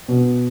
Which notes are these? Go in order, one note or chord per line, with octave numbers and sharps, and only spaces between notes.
B2